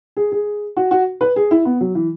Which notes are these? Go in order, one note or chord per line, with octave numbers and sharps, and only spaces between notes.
G#4
G#4
F#4
F#4
B4
G#4
E4
B3
F#3
E3